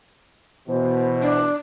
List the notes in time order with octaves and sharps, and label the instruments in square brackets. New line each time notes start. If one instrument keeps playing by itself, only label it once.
[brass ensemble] B2 E3 [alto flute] C5
[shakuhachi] D4